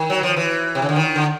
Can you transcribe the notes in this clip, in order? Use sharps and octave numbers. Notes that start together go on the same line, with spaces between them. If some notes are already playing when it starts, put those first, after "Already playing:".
Already playing: D#3
F#3
F3
E3
C3
C#3
D3
D#3
D3